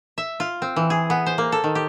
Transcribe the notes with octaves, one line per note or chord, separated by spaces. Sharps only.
E5
F4
C4
E3
G#4
B3
C5
A#3
A4
D#3
G4